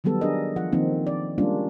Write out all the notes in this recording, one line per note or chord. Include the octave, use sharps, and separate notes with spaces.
D#3 F#3 G3 B3 A4
D4 G#4 A#4 D#5
F3 F4 F#5
D#3 F3 A#3 C4 D#4
D5
G3 G#3 A#3 C#4 D4 F4